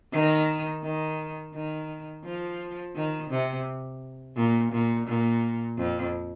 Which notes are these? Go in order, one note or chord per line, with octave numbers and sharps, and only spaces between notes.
D#3
D#3
D#3
F3
D#3
C3
A#2
A#2
A#2
F2